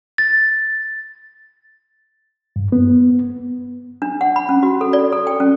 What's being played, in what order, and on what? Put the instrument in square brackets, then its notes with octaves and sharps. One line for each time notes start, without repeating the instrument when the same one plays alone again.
[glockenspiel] A6
[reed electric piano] G2
B3
[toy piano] D4
F#5
B5
C#4
F#4
A4
D5
A4
G5
C#4